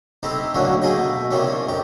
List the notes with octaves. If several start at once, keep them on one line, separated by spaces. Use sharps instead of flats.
A3 C4 D#4 E4 G4
D2 A2 D3 F#3 A#3 C#4
A3 A#3 G#4 D#5 G5
B2 A3
C3 D#3 F3 G3 A#3 C#4
A#1 F2 G4